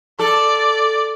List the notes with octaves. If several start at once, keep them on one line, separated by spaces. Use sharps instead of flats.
A4 D5